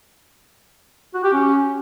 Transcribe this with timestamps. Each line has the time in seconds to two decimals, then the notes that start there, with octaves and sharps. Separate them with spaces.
1.14 F#4
1.23 G4
1.33 C#4